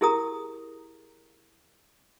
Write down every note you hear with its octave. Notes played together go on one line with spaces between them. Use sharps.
E4 G4 G#4 A#4 A#5 D#6